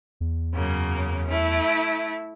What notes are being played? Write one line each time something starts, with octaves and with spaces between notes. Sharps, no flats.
E2
F#2 C#3 A#3
A3 E4